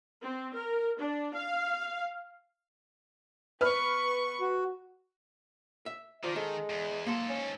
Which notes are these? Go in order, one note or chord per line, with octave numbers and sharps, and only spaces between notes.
C4
A#4
D4
F5
B3 B4 C#6 F6
F#4
E5
D#3 F3 D5
G#3 A4
E2
G#2 A#3 A4 C6
C#4